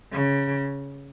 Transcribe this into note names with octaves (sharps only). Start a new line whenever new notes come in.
C#3